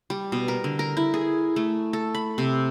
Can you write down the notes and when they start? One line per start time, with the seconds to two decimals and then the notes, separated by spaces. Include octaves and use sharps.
0.10 G3
0.32 B2
0.48 A#4
0.64 D3
0.79 A#4
0.97 E4
1.14 G#4
1.56 A3
1.93 A4
2.15 B5
2.38 C3